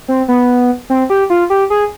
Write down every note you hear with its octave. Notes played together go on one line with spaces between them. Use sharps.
C4
B3
C4
G4
F4
G4
G#4